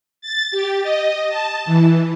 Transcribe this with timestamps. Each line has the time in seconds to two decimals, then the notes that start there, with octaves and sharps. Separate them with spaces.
0.21 A6
0.51 G4
0.83 D#5
1.29 A5
1.65 E3